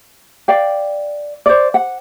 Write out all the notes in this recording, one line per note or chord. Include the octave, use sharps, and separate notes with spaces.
D5 F5 G5
C5 D5
F#5